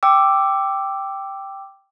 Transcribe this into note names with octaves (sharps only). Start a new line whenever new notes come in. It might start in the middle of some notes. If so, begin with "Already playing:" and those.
G5 D6 E6